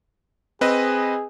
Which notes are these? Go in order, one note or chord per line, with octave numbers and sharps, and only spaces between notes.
C4 G#4 B4 D#5